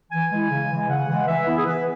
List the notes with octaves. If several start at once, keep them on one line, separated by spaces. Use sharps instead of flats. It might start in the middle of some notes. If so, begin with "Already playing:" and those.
E3 G#5
G#3 E4
C#3
E3 G#3
C#3 F#5
E3 G#3
E3 E5
B3 E4
G#4
E3 B4